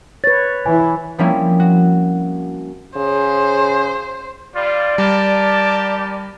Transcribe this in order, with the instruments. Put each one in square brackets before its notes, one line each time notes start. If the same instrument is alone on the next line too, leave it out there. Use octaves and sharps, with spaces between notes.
[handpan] B4 C#5 [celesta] A6
[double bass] E3 E4 [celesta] G#5
[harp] F3 G3 A#3 C4 C#4 E4
F#4
[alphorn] C#3 [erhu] C5
[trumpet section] G3 F4 [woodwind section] D5
[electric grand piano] G3 [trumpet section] G4 A#4 A5